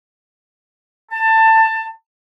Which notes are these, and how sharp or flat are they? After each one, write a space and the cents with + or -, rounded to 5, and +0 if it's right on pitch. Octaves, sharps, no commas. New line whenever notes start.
A5 +20